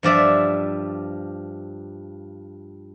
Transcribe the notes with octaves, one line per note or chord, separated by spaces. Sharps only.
G2 F3 D5 E5